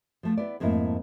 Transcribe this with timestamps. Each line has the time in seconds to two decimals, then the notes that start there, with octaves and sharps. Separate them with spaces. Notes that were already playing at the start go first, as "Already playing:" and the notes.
0.23 F3 A3
0.37 B3 E4 D5
0.60 F2 G#2 A3 A#3 E4